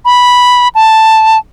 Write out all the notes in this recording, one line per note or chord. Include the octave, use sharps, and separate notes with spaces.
B5
A5